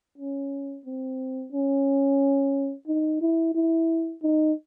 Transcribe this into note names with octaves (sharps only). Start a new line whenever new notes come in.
C#4
C4
C#4
D#4
E4
E4
D#4